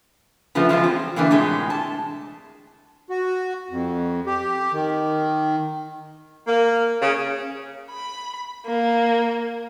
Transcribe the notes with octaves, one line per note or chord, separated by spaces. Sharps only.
C#3 F3 A3 B3
E2 F3 G#3 F4
C4
D3 E3 A#3 C4
A2 C3 G#3
A5
F#4
F2
G4
D#3
A#3
C#3
B5
A#3